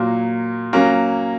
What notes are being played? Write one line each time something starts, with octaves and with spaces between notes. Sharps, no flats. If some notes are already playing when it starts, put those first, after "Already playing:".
Already playing: A#2 F#3 A#3
F#3 A#3 C#4